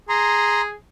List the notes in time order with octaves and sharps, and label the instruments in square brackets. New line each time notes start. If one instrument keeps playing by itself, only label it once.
[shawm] G#4 [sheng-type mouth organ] A#5 C6